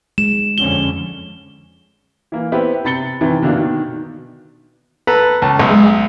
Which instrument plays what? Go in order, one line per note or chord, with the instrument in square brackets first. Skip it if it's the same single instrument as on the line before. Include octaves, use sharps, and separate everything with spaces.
[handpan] G#3 [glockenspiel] E7
[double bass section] F2 D3 C#4 [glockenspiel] G7
[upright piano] E3 A#3
B3 C4 E4 G4 B4
C3 B5 A6 C#7 G7
C3 D#3 E3
B2 D3 A#3 D4 E4
B2 D#3
[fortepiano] A4 B4 A#5
C#2 A5
[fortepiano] B1 [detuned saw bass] G#3